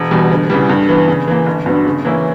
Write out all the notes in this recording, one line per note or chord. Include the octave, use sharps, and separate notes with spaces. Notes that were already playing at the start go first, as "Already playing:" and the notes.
Already playing: E1
E2 B2 G3
D2
C#3 E3 G3
G2
E3 B3
C#3
E3 A#3
G1
G2 F#3 B3
C#3
E3 A#3 C#4 E4